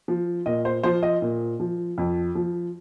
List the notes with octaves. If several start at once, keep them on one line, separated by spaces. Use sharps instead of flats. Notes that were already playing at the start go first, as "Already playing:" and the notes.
F3
A#2 D#5
C5
F3 C5
D#5
A#2
F3
F2
F3